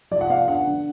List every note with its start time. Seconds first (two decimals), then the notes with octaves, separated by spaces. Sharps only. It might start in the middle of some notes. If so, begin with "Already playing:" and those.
0.11 F3 D5
0.21 F#5
0.30 B3 F5
0.48 D4 F#5
0.67 D3